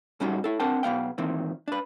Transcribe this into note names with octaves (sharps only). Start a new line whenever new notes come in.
A2 G3 A3 C#4 D#4 F#4
E4 A4
C4 D4 A#4 F#5 G5 A5
B1 B3 F5 G5
A#2 D#3 E3 C4
D4 B4